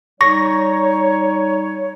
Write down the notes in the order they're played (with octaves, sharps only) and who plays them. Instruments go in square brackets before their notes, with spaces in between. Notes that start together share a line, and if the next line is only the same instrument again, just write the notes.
[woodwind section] G3 D#4 C#5 [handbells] C#6 A#6